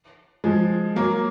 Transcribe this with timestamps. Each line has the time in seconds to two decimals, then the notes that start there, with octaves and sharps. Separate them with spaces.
0.44 F3 G#3
0.96 F#3 A#3